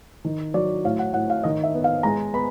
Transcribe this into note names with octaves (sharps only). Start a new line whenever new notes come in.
D#3
F#3 D5
A2 F5
F#5
A2 F#5
F5
D#3 D#5
E5
B3
F5
G#3 A#5
B3 B5